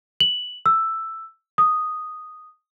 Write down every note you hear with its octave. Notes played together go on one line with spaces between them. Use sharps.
F#7
E6
D#6